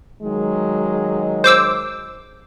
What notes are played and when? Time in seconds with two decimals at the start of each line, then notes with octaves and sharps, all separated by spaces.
0.22 D#3 F#3 G#3
1.44 C5 D6 E6